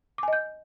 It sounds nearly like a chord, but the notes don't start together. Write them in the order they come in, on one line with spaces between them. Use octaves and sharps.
D6 G#5 D#5 G6